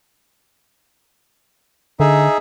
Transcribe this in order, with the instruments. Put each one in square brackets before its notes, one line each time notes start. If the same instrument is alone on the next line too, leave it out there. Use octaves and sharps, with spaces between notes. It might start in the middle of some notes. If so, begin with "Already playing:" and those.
[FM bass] D3 [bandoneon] D#4 G#4 E5